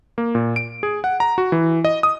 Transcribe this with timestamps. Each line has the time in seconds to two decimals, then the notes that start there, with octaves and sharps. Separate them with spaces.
0.18 A#3
0.35 A#2
0.56 D7
0.83 G#4
1.04 F#5
1.20 A#5
1.38 F#4
1.52 E3
1.85 D#5
2.03 D#6